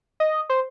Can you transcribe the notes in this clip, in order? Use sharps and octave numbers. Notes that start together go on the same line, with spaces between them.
D#5
C5